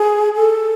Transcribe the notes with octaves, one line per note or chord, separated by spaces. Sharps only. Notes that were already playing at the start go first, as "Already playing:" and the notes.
Already playing: G#4
A4